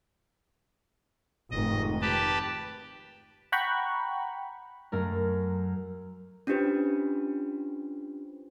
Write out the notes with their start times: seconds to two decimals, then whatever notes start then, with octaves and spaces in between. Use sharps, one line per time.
1.51 F1 G#2 D#3 D#5
2.02 G4 B4 A5
3.52 F#5 G5 A#5 B5 C#6
4.92 F#2 A3 A#4
6.47 C#4 D4 F4 G4 B4 C5